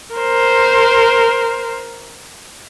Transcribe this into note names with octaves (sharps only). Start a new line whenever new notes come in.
A#4 C5